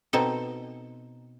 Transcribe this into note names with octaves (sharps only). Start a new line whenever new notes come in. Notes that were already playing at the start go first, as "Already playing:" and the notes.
B2 C4 D#4 A4